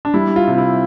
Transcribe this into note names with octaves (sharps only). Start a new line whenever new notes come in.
D4
G3 E4
F4
C3
E4